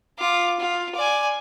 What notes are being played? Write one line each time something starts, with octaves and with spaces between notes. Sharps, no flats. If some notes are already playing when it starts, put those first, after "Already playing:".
F4 D6
F4
D5 G#5